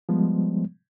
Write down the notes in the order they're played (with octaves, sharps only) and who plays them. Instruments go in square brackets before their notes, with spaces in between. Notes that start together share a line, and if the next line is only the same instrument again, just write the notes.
[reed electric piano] F3 G3 G#3 B3